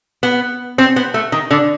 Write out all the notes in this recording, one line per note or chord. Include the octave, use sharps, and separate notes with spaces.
B3
C4
B3
A3
D#3
D3